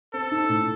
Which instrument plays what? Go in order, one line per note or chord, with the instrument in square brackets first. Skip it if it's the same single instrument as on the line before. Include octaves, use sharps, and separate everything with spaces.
[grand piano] C4 [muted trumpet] A4
[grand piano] D#4
A2